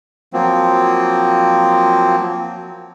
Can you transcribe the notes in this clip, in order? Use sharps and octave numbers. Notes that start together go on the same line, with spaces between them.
F3 F#3 A#3 C4